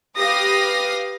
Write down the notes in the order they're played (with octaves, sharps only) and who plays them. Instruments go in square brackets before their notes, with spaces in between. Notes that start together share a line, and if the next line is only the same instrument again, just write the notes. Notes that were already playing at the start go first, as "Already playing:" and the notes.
[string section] G4 B4 F5 D#6 A#6